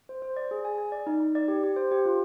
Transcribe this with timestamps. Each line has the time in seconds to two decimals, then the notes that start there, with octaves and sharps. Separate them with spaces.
0.09 C5
0.22 C5
0.37 D5
0.51 G#4
0.65 G#5
0.78 G#5
0.92 D5
1.07 D#4
1.20 D#4
1.35 D5
1.48 G4
1.63 G4
1.76 C5
1.91 G4
2.05 F4